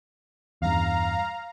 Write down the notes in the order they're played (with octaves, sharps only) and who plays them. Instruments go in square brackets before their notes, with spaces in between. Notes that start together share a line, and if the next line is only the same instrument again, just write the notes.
[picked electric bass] E2 G2 [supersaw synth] F5 A#5